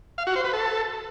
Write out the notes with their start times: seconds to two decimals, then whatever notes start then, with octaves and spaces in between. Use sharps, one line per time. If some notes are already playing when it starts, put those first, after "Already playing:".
0.18 F5
0.27 F#4
0.36 C5
0.44 B4
0.53 A4